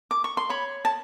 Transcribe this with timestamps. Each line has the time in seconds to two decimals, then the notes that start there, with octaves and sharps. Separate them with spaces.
0.11 D6
0.24 C#6
0.37 C6
0.49 C#5 B5
0.85 A5